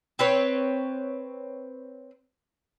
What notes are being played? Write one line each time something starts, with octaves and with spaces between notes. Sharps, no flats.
C4 B4 C#5